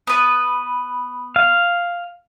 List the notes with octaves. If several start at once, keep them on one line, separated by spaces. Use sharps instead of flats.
B3 B4
F5